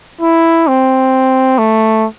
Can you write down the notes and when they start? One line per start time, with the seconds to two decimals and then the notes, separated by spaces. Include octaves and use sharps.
0.22 E4
0.68 C4
1.58 A3